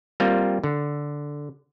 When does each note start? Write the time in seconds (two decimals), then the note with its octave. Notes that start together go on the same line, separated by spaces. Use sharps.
0.20 G3 A#3 C4 F4
0.64 D3